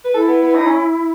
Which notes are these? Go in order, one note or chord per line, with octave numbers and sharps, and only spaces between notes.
B4
E4 A4
B3
B3
D#4
C#4